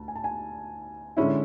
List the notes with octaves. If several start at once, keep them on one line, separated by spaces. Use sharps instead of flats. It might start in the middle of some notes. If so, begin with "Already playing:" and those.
Already playing: D2 A5
G#5
A5
G#5
D3 G#3 C#4 E4